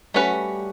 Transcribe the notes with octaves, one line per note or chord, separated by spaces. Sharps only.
G3 A3 C#4 F#4 B4
F#3
G3